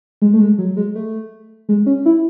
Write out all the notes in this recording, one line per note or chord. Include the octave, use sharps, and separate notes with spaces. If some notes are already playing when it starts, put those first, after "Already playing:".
G#3
A3
G#3
F#3
G#3
A3
G#3
C#4
E4